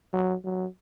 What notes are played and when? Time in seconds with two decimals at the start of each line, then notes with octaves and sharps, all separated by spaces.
0.13 F#3
0.44 F#3